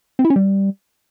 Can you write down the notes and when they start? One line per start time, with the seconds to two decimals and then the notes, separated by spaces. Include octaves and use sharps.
0.19 C4
0.25 E4
0.30 C#4
0.36 G3